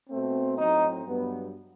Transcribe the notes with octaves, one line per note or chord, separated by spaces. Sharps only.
B2 A3 C4
A2 F#3 C4 D#4
G2 F#3 B3